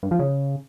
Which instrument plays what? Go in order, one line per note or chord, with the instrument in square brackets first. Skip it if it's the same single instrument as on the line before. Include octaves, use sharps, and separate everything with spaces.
[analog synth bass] G2
F3
C#3